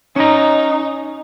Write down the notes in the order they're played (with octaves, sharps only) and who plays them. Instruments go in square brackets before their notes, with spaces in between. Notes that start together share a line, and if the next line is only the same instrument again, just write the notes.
[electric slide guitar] C#4 A#5 [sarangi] D#4